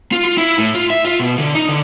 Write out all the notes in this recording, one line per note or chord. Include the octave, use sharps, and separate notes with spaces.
F4
F4
E4
A2
F4
E5
F4
B2
D3
D#4
D3